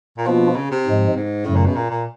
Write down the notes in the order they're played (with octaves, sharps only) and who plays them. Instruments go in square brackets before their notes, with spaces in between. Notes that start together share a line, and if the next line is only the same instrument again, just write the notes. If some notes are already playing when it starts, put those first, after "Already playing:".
[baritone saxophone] A#2
[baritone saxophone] B2 [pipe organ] F3 A#3 D4 F4
[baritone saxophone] C#3
C3
[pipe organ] G#2 F3 G#3
[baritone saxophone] G#2
[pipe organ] F#2 C#3 F#3 A3 [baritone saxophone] A2
[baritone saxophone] A#2
B2
A#2
A#2